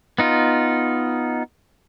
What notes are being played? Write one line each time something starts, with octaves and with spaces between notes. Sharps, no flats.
B3 D#4 F4